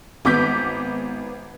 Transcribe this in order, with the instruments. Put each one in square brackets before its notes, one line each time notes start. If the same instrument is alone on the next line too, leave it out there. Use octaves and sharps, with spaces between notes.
[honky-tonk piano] G#1 B3 D6 G6 B6